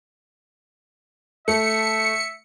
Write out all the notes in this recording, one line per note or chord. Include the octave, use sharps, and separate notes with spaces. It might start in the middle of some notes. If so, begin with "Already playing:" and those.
A3 E5 C#7